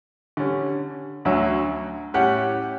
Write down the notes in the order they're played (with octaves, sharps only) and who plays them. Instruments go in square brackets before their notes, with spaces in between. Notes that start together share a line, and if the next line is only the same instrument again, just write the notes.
[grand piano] D3 G3 C#4
[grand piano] D2 D3 F#3 C#4 [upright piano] E5
[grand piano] A2 G3 C#4 G4 [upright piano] F#5